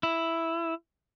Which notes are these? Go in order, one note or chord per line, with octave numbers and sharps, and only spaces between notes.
E4